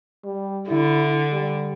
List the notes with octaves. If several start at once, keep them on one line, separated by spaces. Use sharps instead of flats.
G3
D3 E4
G3